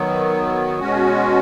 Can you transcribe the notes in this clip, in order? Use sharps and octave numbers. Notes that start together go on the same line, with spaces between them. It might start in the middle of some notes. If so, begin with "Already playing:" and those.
Already playing: D#3 F#3 B3
B2 G#3 C#4 F#4